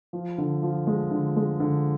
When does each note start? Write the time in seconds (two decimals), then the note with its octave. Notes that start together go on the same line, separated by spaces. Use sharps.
0.13 F3
0.38 D3
0.63 F3
0.87 G#3
1.11 D3
1.36 G#3
1.60 D3